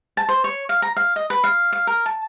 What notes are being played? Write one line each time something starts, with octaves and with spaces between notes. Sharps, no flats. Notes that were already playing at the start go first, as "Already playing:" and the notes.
A5
C5
C#5
F5
A#5
F5
D#5
B4
F5
F5
A#4
A5